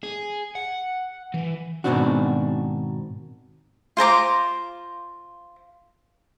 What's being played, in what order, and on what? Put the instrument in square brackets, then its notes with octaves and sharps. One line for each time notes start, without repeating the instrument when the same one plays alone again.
[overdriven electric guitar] G#4
F#5
E3
[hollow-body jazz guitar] G#2 B2 D#3 C4 D4 F#4
[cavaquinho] F4 C5 A#5 D6